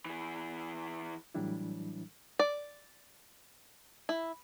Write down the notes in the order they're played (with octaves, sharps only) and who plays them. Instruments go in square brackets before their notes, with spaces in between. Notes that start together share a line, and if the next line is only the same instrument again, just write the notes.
[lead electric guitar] E3 G#4
[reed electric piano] A2 E3 F#3 G3 D4 E4
[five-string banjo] D5
E4